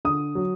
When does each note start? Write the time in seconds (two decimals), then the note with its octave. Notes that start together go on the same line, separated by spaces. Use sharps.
0.05 D3 D#6
0.35 F#3